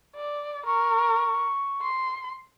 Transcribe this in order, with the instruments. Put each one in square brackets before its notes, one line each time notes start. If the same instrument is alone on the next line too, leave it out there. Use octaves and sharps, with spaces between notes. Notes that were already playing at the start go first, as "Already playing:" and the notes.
[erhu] D5
[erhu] A#4 [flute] C#6
[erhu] C6